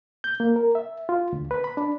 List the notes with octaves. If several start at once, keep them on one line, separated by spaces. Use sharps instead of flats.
G6
A#3
A#4
E5
F4
D2
B4
B5
D4